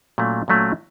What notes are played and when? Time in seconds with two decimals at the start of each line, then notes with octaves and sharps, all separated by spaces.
0.18 A#2 F#3 A3 C#4
0.48 A#2 F#3 A3 C#4